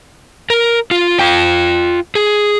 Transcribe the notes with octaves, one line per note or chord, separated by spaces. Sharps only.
A#4
F4
F4 G5
G#4